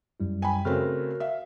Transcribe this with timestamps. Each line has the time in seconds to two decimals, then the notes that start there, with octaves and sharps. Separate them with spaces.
0.20 F#2 G3 E4
0.42 G5 G#5 B5
0.65 C#3 A3 C4 F#4 A#4 C#5 F6
1.20 E5 F5